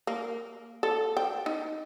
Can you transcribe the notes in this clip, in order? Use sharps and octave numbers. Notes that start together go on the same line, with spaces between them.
A#3
A4
G5
D#4